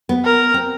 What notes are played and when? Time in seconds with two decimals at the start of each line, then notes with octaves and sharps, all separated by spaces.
0.09 B3
0.25 A#4
0.54 C4